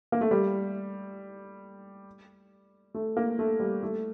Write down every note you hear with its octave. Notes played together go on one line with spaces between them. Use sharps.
A#3
A3
G3
A3
A#3
A3
G3
A3